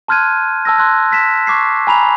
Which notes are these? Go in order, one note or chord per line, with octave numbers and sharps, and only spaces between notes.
A5 C6 F6 F#6 G#6 D#7
A5 E6 A#6
C6 F#6 G#6
A#6 B6 E7
C#6 D6 G#6 C7
G#5 A#5 B5 F7